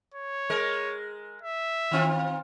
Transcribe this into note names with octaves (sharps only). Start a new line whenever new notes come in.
C#5
G#3 A#4
E5
D#3 C4 F4